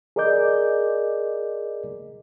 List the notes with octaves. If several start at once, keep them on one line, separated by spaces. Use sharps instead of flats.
G#4 A#4 D5 D#5 D6 G6